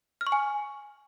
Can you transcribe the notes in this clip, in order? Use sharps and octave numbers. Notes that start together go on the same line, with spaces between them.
F6
C#6
G#5